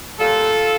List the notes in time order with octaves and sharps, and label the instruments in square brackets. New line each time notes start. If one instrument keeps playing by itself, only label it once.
[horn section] A#2 G3 F4 A4